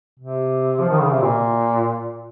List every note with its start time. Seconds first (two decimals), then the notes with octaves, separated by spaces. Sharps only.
0.19 C3
0.80 F3
0.90 D#3
1.01 C#3
1.11 C3
1.21 A#2